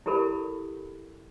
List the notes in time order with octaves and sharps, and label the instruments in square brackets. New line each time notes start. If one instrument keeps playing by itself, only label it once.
[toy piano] E4 G4 A4 A#4 B5